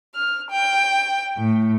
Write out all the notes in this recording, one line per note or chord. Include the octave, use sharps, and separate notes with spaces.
F6
G5
A2